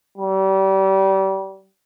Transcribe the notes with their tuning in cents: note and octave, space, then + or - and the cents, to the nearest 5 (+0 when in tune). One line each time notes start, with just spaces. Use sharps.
G3 -30